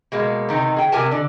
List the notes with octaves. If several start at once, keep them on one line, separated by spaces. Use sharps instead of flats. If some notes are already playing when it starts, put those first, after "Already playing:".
B2 G#3 A#3
C3 D#3 D#4
G#4 G5
C3 G4 A#4 G#5 A5
D3 D5